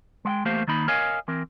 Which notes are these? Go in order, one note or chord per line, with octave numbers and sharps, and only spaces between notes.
G#3 F#5 G5
E2 A3 A#3 G4 C5 F5
D#3 A#3 D#4 B5
A#4 C#5 D#5 F5 G#5
E3 C4 A#4